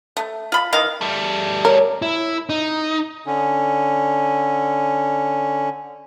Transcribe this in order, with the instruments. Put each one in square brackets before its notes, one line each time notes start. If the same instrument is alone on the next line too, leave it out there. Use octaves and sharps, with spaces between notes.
[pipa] A3
F4 B5
D#3 E3 D#5 F5
[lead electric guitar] G3 A3
[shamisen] A#4 [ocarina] C#5
[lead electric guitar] E4
D#4
[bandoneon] D3 C#4